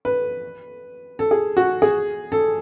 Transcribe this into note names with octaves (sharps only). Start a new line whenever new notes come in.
B4
A4
G#4
F#4
G#4
A4